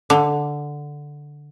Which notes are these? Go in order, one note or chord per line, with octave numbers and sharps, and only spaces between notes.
D3